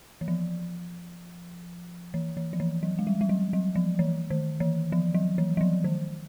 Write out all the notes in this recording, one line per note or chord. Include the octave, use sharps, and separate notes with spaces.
E3
F3
E3
E3
F3
E3
F#3
G#3
G3
G3
F#3
F#3
F3
E3
D#3
E3
F3
F#3
E3
F#3
F3
D#3